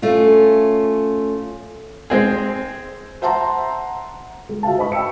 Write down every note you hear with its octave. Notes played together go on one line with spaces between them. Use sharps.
A3 C#4 F4
G#3 C4 G#4
C5 E5 F#5 A5 A#5 C6
G#3
F#4 E5 F5 A5
C5 D#5 B5 C#6
D#5 G5 B5 E6 C#7